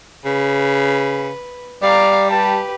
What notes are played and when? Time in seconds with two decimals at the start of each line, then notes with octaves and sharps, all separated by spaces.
0.25 C#3 B4
1.82 G3 D5 F5 A#5
2.30 G4 B4 A5